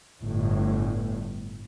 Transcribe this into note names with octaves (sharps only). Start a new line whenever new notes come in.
G1 A2